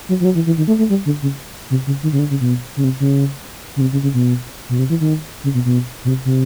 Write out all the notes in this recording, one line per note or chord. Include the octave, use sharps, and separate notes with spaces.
F#3
F3
F#3
E3
E3
D#3
A3
A3
G3
D3
C#3
C3
C#3
D#3
C#3
D3
C#3
B2
C#3
C3
C#3
C#3
C3
C#3
C#3
B2
B2
C3
E3
D#3
C#3
B2
B2
B2
C3
C3